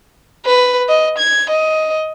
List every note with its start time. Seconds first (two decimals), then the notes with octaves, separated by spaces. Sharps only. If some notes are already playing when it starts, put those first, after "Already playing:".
0.46 B4
0.89 D#5
1.19 G#6
1.50 D#5